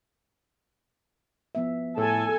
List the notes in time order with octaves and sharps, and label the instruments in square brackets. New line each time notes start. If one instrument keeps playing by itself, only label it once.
[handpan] F3 B3 E5
[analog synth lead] A2 [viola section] A4 G#5